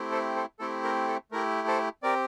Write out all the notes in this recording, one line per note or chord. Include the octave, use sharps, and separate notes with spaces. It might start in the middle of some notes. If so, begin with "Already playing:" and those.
Already playing: A3 C4 E4 G4
A4 C5
A4 C5
A3 C4 E4 G4 A4
A#4
A4
A3 E4 G4 A#4
A4 C5
C4 G4 A#4 D5